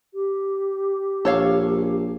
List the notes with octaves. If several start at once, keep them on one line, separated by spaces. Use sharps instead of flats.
G4
A#1 A4 C#5 F5